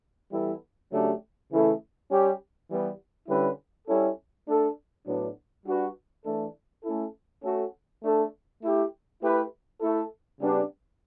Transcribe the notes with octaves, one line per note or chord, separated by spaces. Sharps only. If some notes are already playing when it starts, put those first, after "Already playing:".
E3 G3 B3 E4 A4
C#3 F#3 A3 D4 G4
C#3 E3 A3 E4 A4
G3 C#4 G4
E3 G3 B3
D3 G3 C#4 E4 B4
G3 C#4 E4 A4
A3 D4 A4
A2 F#3 B3 D4
G3 D4 F#4 B4
E3 A3 D4 A4
A3 C#4 E4 A4
A3 C#4 F#4 A4
A3 D4 A4
A3 E4 G4
A3 E4 G4 B4
A3 E4 A4
C#3 G3 B3 D4 G4